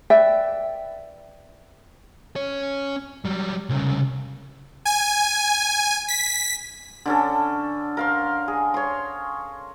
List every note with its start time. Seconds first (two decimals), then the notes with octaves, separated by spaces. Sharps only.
0.10 B4 D5 E5 G5
2.36 C#4 C#5
3.25 F#3 G3
3.69 C2 C#3
4.85 G#5
6.08 B6
7.06 D3 C#4 A4
7.97 A#4 F5 C6
8.48 G#4
8.74 C#5 C6